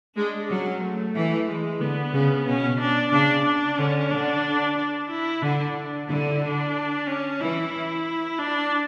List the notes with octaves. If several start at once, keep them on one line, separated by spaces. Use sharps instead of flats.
G#3 D4
F#3 C#4
A3
E3
G#3
D3 B3
C#3
B2 C#4
D4
C#3 D4
D4
D3 C#4
D3 D4
D4
E4
D3 D4
D3 E4
D4
C#4
E3 E4
D4